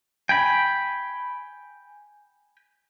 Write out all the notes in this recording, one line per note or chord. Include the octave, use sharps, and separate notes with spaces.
G5 G#5 B5